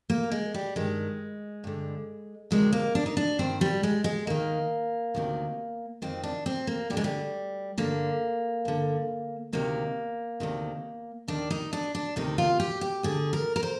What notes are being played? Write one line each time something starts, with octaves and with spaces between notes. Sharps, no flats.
A#3
G#3
G3
G2 D#3 G#3
G2 D3
D2 C3 D#3 G#3
A#3
D4
D#4
D4
G2 D#3 C4
G3
G#3
G#3
D#2 D#3 A#3
D2 C3 D#3
F2 D#3 C4
D4
C4
A#3
D2 D3 G3 G#3
G3
G2 D3 A#3
G2 D3
D2 C3 D#3 A#3
D2 C3 D#3
D#2 D#3 D4
D#4
D4
D4
D2 C3 D#3 D#4
F4
G4
G4
D2 D3 G#4
A#4
A#4
C5